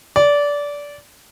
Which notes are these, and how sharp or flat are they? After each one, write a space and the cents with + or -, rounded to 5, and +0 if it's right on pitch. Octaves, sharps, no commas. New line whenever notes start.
D5 -20